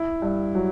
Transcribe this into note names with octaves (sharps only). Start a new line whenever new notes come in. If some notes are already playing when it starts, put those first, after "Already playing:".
Already playing: E4
G2
F#3